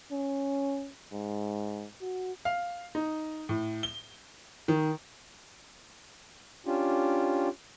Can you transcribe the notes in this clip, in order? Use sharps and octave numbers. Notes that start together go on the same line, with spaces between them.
C#4
G#2
F#4
F5
D#4
A2
G7
D#3
C#4 D4 F4 G4